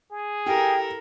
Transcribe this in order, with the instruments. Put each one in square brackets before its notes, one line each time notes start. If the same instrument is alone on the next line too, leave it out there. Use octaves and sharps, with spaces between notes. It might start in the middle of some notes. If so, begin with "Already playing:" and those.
[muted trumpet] G#4
[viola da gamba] E4 A4 A#4 [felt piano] G4 [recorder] G5